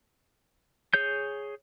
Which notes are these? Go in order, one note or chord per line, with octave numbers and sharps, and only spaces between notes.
G#4 C#5 G6